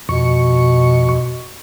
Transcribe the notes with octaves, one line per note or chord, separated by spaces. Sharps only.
F2 B2 C#6